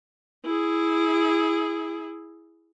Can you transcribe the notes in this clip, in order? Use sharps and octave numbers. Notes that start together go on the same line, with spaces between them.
E4 G#4